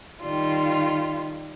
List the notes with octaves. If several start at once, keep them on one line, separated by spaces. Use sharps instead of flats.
D#3 G3 F4